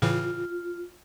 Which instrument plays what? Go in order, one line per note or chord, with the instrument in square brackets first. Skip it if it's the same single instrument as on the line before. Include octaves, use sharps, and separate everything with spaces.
[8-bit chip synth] A2 C#3 E3 [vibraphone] F4